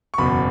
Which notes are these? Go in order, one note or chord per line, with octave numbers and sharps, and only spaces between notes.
C#6
F#1 E2 B2 B5